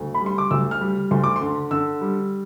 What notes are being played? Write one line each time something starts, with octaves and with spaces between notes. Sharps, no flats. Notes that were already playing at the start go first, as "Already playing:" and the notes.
Already playing: D2
B5
G3
C6
D6
D2 E6
F6
G3
D2 C6
D6
D3 C6
D3 E6
G3